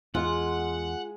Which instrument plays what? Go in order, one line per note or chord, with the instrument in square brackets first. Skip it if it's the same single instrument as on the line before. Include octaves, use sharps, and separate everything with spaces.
[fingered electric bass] E2 [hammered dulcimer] G#3 [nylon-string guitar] F4 [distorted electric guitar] F#5